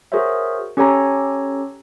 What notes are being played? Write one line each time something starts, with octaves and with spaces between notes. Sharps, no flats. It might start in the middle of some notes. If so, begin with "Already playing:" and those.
F#4 G#4 A#4 C5 C#5 E5
C#4 G4 A4 C#5 G#5 A#5